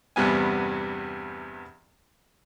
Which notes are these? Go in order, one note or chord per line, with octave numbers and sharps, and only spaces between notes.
E2 G2 C3 G3 B3 G#5